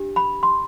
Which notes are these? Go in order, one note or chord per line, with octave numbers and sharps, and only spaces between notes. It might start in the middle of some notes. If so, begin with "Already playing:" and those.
Already playing: D4 G4
B5
C6